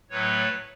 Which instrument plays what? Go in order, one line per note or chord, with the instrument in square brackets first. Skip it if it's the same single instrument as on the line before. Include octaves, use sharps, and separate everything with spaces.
[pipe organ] A2 F#3 A3 B4 C#5